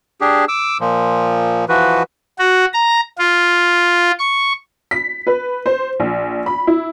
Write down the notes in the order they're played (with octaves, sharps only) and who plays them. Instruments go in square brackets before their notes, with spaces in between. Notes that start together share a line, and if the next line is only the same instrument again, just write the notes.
[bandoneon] D4 G4 G#4
D6 E6
A#2 F3
E3 F3 F#4 B4
[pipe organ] F#4
A#5
F4
C#6
[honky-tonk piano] B6
B4
C5
A#1
B5
E4